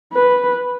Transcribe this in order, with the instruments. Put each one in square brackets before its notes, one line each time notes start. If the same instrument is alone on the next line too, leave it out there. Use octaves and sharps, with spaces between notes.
[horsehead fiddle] B4